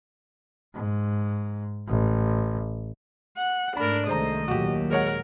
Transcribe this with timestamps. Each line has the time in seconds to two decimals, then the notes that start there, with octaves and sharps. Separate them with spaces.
0.75 G#2
1.88 A1
3.38 F#5
3.77 G#2 A3 D4 A#4 B5
4.07 C2 D#3 G#3 A3 C5 D#5 A#5
4.48 D#2 A#2 F#3 F#4 G4
4.91 G#3 A#4 C#5 F#5